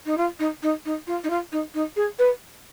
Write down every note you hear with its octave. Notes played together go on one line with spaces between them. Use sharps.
D#4
F4
D#4
D#4
D#4
F4
D#4
F4
D#4
D#4
G#4
B4